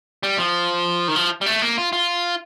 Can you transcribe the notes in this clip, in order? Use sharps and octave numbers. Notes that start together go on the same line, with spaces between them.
G3
F3
D#3
F3
G3
A3
A#3
F4
F4